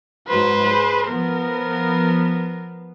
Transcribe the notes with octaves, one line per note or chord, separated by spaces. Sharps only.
G#2 F#3 B4 C5
G#4
F3 B3 A#4